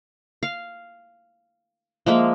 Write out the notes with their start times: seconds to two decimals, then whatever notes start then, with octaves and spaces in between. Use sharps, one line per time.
0.43 F5
2.06 F3 G#3 A#3 E5